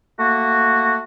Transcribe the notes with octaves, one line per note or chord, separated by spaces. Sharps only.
A3 A#3 F#4